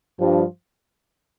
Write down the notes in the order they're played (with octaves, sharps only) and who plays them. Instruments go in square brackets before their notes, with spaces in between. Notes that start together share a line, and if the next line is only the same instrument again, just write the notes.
[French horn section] G2 [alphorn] F3